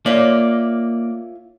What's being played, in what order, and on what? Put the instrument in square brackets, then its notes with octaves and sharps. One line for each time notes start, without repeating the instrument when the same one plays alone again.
[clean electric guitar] A#3 D5 [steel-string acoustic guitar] F4 C#5 E5